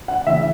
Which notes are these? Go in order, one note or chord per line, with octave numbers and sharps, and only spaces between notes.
F#5
C#3 E3 E5